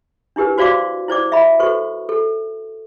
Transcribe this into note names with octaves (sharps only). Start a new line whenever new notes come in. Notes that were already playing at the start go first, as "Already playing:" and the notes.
D4 E4 G4 A#4 B4
F#4 C5 D5 F5 C6 D6
E4 C5 D5 D6
D#5 E5 A#5 B5
F#4 A4 B4 C5 C#6
A4